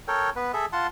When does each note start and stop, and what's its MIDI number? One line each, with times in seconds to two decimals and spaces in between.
0.08 0.30 69
0.08 0.30 70
0.08 0.30 73
0.08 0.30 79
0.36 0.52 59
0.36 0.52 71
0.53 0.66 68
0.53 0.66 69
0.53 0.66 76
0.73 0.87 65
0.73 0.87 78
0.73 0.87 81
0.73 0.87 84